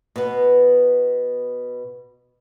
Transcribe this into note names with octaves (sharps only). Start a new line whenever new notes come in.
B2 B3